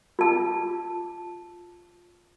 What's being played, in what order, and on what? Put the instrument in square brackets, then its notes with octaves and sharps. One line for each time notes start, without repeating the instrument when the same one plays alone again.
[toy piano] F4 A5